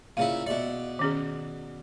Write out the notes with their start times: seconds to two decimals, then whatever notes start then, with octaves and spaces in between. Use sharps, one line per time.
0.17 A#2 C#3 E4 F5
0.46 B2 D5 E5
0.99 D#3 C#4 G#4